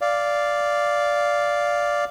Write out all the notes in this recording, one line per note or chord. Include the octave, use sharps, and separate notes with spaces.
D5 F5